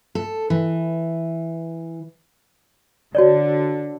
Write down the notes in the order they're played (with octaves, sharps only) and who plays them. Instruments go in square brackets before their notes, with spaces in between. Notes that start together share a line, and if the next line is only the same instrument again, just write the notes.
[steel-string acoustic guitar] A4
E3
[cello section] D3 [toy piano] F#4 C#5 D5